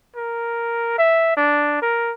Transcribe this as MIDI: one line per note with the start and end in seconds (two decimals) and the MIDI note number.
0.16 0.95 70
0.98 1.36 76
1.37 1.78 62
1.82 2.12 70